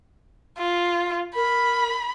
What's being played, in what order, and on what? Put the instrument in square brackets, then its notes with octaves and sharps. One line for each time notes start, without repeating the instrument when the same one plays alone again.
[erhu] F4
[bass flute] A#4 [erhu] B5